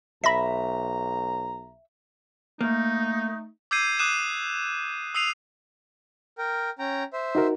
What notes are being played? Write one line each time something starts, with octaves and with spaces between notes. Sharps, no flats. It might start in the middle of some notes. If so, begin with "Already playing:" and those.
B1 E5 A#5 B5 A#6 B6
A3 A#3 D#4
D6 E6 G6 G#6 C7 D#7
D6 D#6 F#6 C7 D#7 E7
D#6 E6 C7 D#7 F7
A#4 G5
C#4 G5 A#5
C5 E5
D#4 F#4 A#4